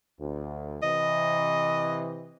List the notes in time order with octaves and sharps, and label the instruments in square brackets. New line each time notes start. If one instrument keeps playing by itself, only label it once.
[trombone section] D2
[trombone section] C3 E3 [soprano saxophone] D#5